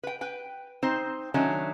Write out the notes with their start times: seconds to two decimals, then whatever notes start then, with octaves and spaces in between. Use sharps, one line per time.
0.03 B4 G5
0.21 B4 G5
0.83 C4 D#4 C5
1.34 D#3 F#3 A3 C#4 D4